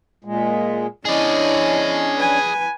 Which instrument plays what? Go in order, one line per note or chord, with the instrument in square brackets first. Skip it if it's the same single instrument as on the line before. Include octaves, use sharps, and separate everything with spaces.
[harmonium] A#2 G#3
[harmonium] C#4 D4 [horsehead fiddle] E4 D#5 [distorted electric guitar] G#4 D5
[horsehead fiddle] B4 G#5